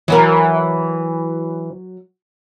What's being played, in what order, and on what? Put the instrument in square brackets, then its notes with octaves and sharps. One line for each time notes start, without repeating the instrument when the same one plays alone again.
[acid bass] E3 [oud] F#3 F#4 A#4